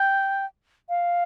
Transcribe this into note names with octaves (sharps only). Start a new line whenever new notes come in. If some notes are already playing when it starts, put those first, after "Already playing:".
Already playing: G5
F5